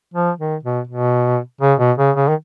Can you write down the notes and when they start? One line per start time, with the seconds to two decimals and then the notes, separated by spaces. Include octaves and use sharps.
0.14 F3
0.39 D#3
0.63 B2
0.88 B2
1.61 C#3
1.79 B2
1.98 C#3
2.16 C#3
2.29 D#3